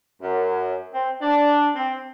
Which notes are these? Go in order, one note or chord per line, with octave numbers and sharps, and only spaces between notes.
F#2
C4
D4
C4